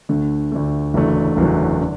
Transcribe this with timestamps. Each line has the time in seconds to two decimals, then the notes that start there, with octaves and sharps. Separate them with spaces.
0.09 D2 D3 A3
0.52 D2 D3 A3
0.94 F#1 E2 D3 F#3 A3
1.37 F#1 E2 D3 F#3 A3
1.81 D3